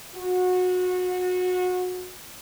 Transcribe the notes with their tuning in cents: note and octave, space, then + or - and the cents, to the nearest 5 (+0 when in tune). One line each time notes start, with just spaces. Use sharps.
F#4 -25